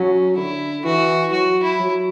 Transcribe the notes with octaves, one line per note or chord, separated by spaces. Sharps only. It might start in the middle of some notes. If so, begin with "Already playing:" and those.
Already playing: F#3 C#4
D3 E4
E3 F#4
F#3 F#4
E4
F#3